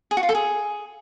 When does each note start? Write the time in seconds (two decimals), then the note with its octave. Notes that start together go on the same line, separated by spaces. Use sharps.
0.11 G#4
0.17 F#4
0.23 F4
0.29 A4
0.35 G#4